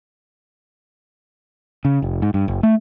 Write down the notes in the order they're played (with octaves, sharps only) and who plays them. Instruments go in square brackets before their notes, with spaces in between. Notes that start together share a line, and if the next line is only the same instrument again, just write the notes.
[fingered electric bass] C#3
F1
G#2
G2
F#1
A3